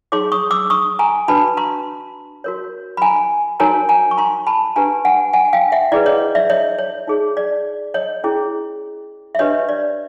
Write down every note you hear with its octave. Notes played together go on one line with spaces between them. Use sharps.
D#4 G#4 C#5 C6 D6
C#6 D#6
D6 E6
C#6 D#6
G#5 A#5
D4 F#4 B4 A5 B5
A#5 C6
F#4 A#4 C#5
B5
G#5 A#5
D#4 F#4 A#4 C#5 G#5 A#5
G#5 A#5
C#6
A#5 C6
A5 B5
D4 G4 B4 G#5 A#5
F#5 G#5
F#5 G#5
F5 G5
E5 F#5
E4 G#4 B4 D5
C#5 D#5
D5 E5
C#5 D#5
C#5
D#4 G#4 C#5
D5
C#5 D#5
C#4 E4 G#4
E5
D4 G4 B4 C#5 D#5
D5